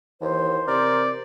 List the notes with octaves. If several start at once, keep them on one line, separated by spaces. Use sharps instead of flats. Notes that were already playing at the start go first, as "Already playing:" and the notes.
D#2 E3 C5
C3 A#4 D5